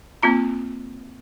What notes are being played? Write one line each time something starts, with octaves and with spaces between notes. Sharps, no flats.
A#3 C4 F4 A#5